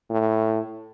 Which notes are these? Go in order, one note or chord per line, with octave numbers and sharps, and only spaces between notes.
A2